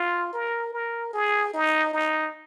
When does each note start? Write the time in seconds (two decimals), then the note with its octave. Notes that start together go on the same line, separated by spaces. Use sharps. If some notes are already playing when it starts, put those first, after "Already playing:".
Already playing: F4
0.33 A#4
0.73 A#4
1.13 G#4
1.54 D#4
1.94 D#4